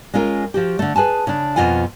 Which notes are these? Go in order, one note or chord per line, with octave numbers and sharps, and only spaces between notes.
G#3 C#4 F4 A#4
F3 F#4 G4
D3 A3
G#4 B4 G#5 A5
C#3 D4
F2 B2 F4 F#5 G#5